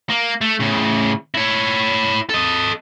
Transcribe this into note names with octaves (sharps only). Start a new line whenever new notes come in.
A#3
A3
A2 C#3
E4 C#5
A4 D#5